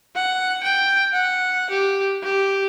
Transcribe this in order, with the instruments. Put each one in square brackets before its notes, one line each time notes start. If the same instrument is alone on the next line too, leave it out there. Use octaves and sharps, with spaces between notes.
[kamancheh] F#5
G5
F#5
G4
G4